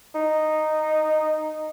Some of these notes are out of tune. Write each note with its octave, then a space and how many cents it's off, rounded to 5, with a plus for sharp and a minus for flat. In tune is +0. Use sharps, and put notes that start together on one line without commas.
D#4 -10